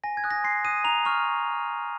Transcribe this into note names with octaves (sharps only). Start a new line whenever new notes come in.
G#5 A#6
G#6
D#6 F#6
A#6
C6 C7
D#6 F#6 D#7
A#5 F7
C#6 F6 F7